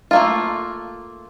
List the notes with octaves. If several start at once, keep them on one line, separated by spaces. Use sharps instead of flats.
A3 A#3 F4